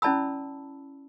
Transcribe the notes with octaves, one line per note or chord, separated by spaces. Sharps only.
C#4 E4 D5 A5 B5 E6